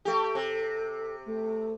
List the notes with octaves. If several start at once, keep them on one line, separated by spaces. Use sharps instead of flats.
A3 G4 A4
C3
A3